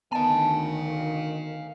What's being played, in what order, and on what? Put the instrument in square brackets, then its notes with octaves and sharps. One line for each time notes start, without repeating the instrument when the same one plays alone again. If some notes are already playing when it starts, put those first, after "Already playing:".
[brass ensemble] D2 D#3 [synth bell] B3 D#5 [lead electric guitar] F5 G#5 [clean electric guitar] A5